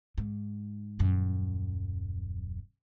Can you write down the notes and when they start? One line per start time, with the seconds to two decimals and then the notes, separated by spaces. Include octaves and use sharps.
0.18 G#2
0.99 D#1 F#2